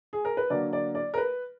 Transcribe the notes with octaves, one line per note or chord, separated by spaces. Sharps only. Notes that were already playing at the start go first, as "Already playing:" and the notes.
G#4
A#4
B4
D3 F#3 A#3 D5
D5
D5
A#4
B4